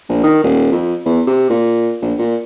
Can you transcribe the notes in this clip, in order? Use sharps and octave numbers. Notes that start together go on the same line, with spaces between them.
A#1
D#3
D#1
F2
E2
C3
A#2
A#1
A#2